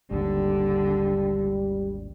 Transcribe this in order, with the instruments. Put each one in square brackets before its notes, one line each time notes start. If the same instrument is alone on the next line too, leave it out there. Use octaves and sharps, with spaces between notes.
[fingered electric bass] G#1 D#2 [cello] D3 [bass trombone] G3